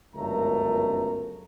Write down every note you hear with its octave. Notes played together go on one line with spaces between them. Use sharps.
G1 C#2 F#2 A3 A#4 A#5